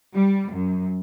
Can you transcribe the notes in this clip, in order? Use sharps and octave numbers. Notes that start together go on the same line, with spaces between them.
G3
F#2